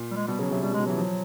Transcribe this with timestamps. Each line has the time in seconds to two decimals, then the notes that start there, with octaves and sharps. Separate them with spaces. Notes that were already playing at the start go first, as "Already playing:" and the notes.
Already playing: A#2
0.11 G3
0.16 G#3
0.27 B2 G3
0.39 C#3 F#3
0.51 C3 F#3
0.62 B2 G3
0.71 C3 G#3
0.80 B2
0.86 E3 F#3
0.98 F3